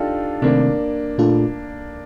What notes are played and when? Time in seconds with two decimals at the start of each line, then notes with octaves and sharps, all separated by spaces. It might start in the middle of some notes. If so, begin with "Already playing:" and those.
Already playing: D4 D#4 F4 G4 A4
0.42 C3 D#3 A3 A#3 C4 D4
1.18 A#2 A3 D4 F4 A4